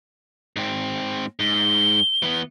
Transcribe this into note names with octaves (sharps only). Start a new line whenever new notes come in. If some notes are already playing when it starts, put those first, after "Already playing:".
G#2 C4
G#2 G7
E3 B3